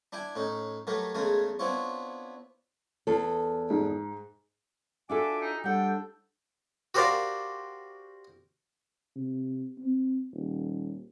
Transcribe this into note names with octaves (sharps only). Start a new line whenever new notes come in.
D4 E4 G5 G#5
A2 C#4 D#4
F#3 A3 G4 A#4 B4
E2 C#3 G#3 A3 A#4 G#5
B3 C4 D4 E4 F4 C#5
E2 A4
G#2
D4 F4 F#4 A4 E5 G#5 D6
D#4
A2 G3 D4 A4 F#5 G5
F#4 G4 A#4 C5 D5 F5
C3
C4
D#1